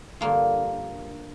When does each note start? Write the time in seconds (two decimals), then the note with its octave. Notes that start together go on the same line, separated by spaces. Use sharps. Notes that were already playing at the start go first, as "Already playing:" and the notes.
0.21 G2 D3 F3 A#3